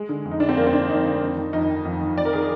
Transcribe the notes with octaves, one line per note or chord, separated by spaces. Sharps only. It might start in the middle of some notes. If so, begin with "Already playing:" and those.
Already playing: G#3
D3
F2
D#4
D3 D4
C4
F2 A#3
C4
D3 D4
F2 D#4
D3
F2
D#3
F2 D#4
D#3
F2
D#3
F2 D5
A#4
D#3 G#4